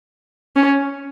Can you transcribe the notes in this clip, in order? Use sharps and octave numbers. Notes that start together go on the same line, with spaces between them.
C#4